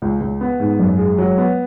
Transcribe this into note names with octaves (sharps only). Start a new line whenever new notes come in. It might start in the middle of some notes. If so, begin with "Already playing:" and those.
C#2
C#2
B3
G#2
F#2
G#3
F#3
B3